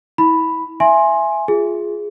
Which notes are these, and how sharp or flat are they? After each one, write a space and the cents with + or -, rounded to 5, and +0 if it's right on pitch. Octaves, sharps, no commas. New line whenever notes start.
E4 -30 B5 +0
E5 +15 G#5 +5 C6 +20
F4 +0 G#4 +0